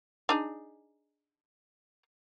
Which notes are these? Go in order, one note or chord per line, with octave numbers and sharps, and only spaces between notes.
D4 D#4 G#4